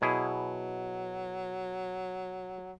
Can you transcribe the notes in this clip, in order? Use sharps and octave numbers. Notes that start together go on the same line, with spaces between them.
B2 F#3 E4 G#4